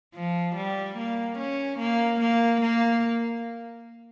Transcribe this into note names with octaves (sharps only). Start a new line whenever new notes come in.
F3
G3
A#3
C#4
A#3
A#3
A#3